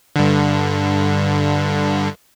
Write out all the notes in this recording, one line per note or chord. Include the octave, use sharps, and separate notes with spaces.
G2 D3